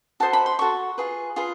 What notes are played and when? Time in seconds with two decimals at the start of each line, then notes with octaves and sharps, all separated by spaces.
0.20 F#4 A4 C5 D#5 A5
0.33 B5
0.46 C6
0.59 F#4 A4 C#6
0.98 F4 G#4 B4
1.36 F4 G#4 B4